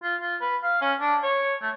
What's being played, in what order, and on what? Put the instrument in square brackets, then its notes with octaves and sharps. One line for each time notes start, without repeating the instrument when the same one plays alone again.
[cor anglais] F4
F4
B4
F5
C#4
D4
C#5
A3